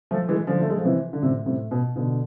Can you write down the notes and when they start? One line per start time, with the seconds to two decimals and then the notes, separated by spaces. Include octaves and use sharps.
0.11 F3 A3
0.29 E3 G#3
0.47 D3 F3
0.62 A3
0.70 G#3
0.77 F3
0.85 C3 E3
1.13 D3
1.22 A2 C3
1.46 A2 C3
1.71 B2
1.96 B2 D3